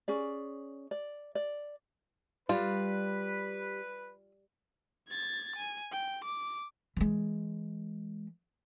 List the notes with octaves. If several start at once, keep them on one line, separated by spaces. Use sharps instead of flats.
C#4 G#4 D5
D5
D5
G3 F4 B4
G#6 A6
G#5
G5
D6
E3 G#3